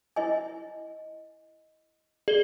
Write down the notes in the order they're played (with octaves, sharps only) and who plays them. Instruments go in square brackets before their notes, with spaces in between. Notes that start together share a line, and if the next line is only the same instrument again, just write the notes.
[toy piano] E4 D#5 G#5
[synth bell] G#4 G7 [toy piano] D5